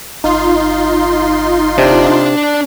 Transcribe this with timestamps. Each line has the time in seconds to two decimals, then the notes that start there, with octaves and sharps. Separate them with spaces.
0.24 G1 D#4 F4 C6
1.78 C3 D4 D5